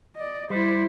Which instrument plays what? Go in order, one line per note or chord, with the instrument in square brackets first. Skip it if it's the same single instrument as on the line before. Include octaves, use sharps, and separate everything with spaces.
[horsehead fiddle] D5 D#5
[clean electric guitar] G3 [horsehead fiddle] E4 C5